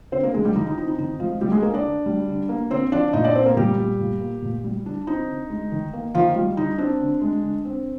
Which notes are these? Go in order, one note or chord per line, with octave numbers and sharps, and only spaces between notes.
D3 C4 C5
A#3 A#4
F3 G#3 G#4
G3 G4
D#3 D#4
D#4
C4 D#4
D#4
D#3 D#4
F3 G#3 F4
D3 G3 G4
G#3 G#4
A#3 A#4
D4 D5
D3
G3
D3
A#3
D3 C4 C5
F3 D4 D5
A#2 D#4 D#5
D4 D5
A#3 C4 C5
A#3 A#4
A#2 G3 G4
G3
A#2
A#3
A#2
G3
D3 D4
C4 D#4
D3
G#3
D#3
A#3
D#3 F3 F4
G3
D3 D#4
C4 D4
D3
G#3
D3
C4